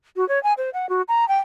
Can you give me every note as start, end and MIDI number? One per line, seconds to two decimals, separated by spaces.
0.16 0.27 66
0.29 0.41 73
0.43 0.53 80
0.58 0.70 72
0.74 0.88 78
0.89 1.02 66
1.08 1.27 82
1.28 1.39 79